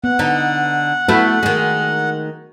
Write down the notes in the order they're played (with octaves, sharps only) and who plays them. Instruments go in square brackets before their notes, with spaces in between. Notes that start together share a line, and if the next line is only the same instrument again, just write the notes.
[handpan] B3 [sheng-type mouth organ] F#5
[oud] D3 D#4
[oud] A3 B3 E4 [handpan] F#4
[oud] D#3 G#3